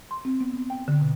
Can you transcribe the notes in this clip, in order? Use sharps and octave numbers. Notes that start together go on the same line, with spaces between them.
C6
C4
B3
B3
G5
D3
B2